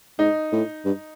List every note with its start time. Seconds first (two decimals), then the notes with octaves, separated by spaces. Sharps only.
0.19 G#2 D#4
0.52 A2
0.85 G2